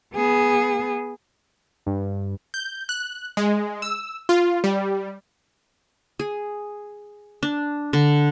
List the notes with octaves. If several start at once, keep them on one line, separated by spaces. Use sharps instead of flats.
B3 G#4
G2
G6
F#6
G#3
E6
F4
G3
G#4
D4
D3